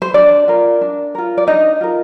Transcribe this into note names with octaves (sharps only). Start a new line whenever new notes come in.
C5
D4 D5
F4 A#4
D4
F4 A#4
D5
D4 D#4 D#5
F4 A#4